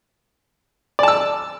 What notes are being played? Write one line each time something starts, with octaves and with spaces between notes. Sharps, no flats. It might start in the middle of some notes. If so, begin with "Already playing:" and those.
D5 A5 E6